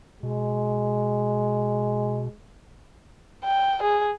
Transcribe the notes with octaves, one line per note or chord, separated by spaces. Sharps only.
B2 G#3
G5
G#4